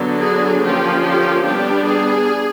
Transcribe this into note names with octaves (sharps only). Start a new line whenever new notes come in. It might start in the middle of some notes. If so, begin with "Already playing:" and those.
Already playing: D3 F#3 B3 D4
G#4
D3 F3 A#3 C#4 G4
G4
G3 B3 D4 G4
G#4